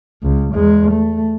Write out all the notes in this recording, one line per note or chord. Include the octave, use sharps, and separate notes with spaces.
C#2
E2 G#3
A3